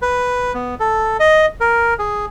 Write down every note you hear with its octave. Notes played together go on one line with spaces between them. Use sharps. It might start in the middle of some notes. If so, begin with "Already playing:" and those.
B4
B3
A4
D#5
A#4
G#4